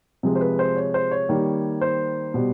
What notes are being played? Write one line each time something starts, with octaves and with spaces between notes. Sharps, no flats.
C3 F3 G#3
C5
B4
C5
C#5
C5
C#5
D#3 G3 A#3
C5
B2 G3 B3